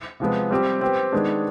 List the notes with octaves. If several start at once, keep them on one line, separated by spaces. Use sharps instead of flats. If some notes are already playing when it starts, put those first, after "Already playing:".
C3 F3 G#3 B3
G3 C4 G4
C4 G4 B4
D#3 G#3 B3 D4 G#4